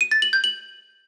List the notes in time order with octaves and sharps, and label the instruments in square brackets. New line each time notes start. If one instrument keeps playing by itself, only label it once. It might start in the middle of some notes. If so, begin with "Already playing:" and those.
[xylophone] D#7
A6
F#7
G6
F#7